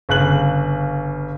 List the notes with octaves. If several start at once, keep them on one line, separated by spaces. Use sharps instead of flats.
G1 C#3 F#6 F#7